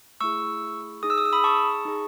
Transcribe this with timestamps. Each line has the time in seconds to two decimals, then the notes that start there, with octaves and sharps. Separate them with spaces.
0.20 A3 E4 G#4 C#6 E6
1.03 D#4 G#4 D#6
1.10 E6
1.18 D#6
1.25 E6
1.33 B5 D#6
1.44 A5 C#6
1.85 D#4 G#4